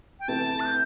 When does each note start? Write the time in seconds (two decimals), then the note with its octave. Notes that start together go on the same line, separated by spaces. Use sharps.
0.19 G5
0.28 C3 E3 A3 E4 A5
0.60 F#6
0.65 G6